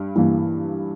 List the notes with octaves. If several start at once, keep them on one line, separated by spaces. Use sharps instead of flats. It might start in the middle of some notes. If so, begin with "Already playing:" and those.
Already playing: G2
G2 E3 A#3